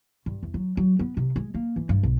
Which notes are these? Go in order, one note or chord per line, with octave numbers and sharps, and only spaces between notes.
G2
E2
F#3
F#3
B3
C3
G#3
A#3
E3
G2
B1